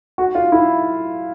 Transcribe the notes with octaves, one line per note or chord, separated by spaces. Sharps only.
F#4
F4
E4